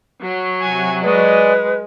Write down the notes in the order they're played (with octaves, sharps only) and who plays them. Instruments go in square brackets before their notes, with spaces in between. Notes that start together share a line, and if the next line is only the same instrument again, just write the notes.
[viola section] F#3
[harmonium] C3 [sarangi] G#5
[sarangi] G#3 [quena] B4 [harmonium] D5 D#5 G#5